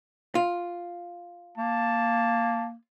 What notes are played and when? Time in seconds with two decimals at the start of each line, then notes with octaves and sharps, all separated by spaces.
0.35 F4
1.58 A#3 A5